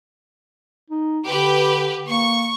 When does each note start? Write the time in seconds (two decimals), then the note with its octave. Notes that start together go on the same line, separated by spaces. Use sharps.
0.90 D#4
1.26 D3 G4 B4
2.07 A#3 C#6